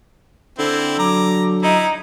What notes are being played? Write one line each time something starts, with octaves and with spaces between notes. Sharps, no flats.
D3 C4 E4
F#3 A#5 D6
D#4 E4